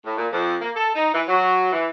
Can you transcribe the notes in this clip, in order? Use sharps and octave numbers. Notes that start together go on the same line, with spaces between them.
A2
A#2
F2
A#3
A4
D#4
E3
F#3
E3